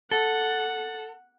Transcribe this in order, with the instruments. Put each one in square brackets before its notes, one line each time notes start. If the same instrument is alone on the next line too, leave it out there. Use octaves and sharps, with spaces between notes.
[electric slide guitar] A4 [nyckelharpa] F#5